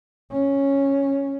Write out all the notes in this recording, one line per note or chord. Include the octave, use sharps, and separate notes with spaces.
C#4